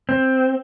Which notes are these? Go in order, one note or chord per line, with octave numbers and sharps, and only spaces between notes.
C4